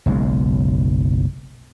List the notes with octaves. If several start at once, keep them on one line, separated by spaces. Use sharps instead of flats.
F#1 B1 F#2 G#3